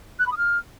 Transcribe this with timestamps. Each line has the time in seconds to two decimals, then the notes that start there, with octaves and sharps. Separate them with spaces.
0.19 F#6
0.25 B5
0.31 D#6
0.37 F6